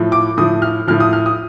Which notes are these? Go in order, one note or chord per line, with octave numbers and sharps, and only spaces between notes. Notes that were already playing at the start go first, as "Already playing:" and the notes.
Already playing: A2 F3
D6
A2 F3 D#6
F6
A2 F3 F6
D#6
F6
D#6